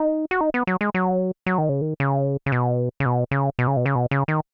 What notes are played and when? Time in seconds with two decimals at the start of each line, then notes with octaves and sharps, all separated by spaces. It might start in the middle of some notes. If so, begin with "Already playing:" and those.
Already playing: D#4
0.31 F#4
0.41 D#4
0.54 B3
0.67 F#3
0.81 G#3
0.94 F#3
1.46 F#3
1.58 D#3
1.69 C#3
1.81 D#3
2.00 C#3
2.46 C#3
2.52 B2
3.00 C#3
3.06 B2
3.31 C#3
3.59 B2
3.67 C#3
3.77 B2
3.86 C#3
3.95 B2
4.11 C#3
4.28 D#3